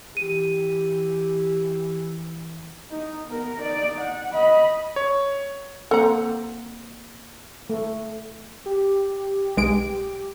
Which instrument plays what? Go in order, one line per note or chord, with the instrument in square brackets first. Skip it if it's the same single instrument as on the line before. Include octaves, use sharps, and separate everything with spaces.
[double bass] E3 [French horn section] G4 [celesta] D#7
[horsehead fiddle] D#4
B3 A#4
D#4 D5
F#5
D#5 B5
[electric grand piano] C#5
[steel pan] A#3 C4 F#5 [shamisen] A4 A#5
[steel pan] A3
[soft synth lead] G4
[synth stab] B1 G#3 D7